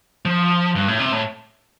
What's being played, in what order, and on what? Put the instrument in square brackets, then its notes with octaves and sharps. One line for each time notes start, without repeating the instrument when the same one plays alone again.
[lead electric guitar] F3
G2
A2
C3
A2